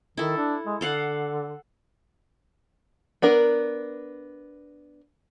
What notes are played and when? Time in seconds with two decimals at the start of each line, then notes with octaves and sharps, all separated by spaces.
0.17 D#3 E4 A4
0.37 D4
0.66 G#3
0.81 D3 A4 F5 F#5
3.22 B3 D4 A#4